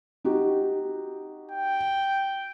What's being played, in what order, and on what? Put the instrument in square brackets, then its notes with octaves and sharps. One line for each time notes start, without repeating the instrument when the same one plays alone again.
[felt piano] D#4 F#4 G4
[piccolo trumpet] G5